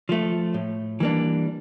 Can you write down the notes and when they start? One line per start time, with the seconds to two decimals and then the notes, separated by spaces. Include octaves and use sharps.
0.09 F3 A3
0.54 A2
1.00 E3 G3 A#3 D4